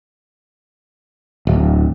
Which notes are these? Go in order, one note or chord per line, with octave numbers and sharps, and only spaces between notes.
D1